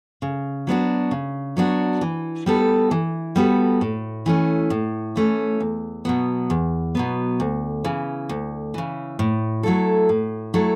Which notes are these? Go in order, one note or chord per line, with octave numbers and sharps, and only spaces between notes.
C#3
F#3 B3 D4 F#4
C#3
F#3 B3 D4 F#4
E3
G3 B3 F#4 A4
E3
G3 B3 F#4 A4
A2
E3 A3 C#4
A2
E3 A3 C#4
E2
B2 F#3 B3
E2
B2 F#3 B3
D2
C#3 E3
D2
C#3 E3
A2
F#3 A3 E4 A4
A2
F#3 A3 E4 A4